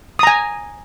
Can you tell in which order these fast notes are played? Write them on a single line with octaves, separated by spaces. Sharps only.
D#6 A#5 G#5